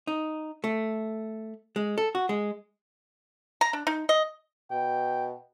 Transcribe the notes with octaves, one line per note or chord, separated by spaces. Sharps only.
D#4
A3
G#3
A4
F#4
G#3
A#5
D4
D#4
D#5
B2 G5